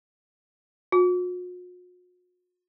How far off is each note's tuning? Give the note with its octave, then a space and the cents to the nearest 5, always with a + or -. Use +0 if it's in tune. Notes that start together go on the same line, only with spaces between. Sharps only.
F#4 -45